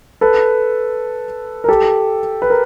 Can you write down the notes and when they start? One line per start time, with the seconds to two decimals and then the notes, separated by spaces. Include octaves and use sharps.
0.21 A4 B4
1.64 A#4
1.68 G4 A4
2.42 B4
2.50 A#4